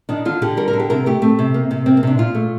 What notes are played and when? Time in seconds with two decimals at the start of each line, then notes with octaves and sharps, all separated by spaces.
0.09 D#3 D4
0.25 D3 F4
0.42 D3 G4
0.57 G3 A#4
0.68 A#4
0.73 D3
0.80 G4
0.90 C3 A#4
1.06 A3 G4
1.22 A3 C4
1.39 C3
1.54 A#3
1.71 C3
1.86 A#3 C4
1.97 A#3
2.03 C3 D4
2.18 A#2 F4
2.35 A3